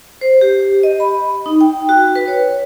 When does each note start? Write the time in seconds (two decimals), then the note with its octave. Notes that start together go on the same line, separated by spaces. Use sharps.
0.21 C5
0.41 G4
0.83 D#5
1.00 B5
1.46 D#4
1.61 G5
1.89 F#4
2.16 B4
2.28 C#5